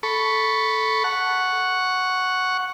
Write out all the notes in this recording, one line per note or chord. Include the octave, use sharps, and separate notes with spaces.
A4 B5 C#6
F#5 C#6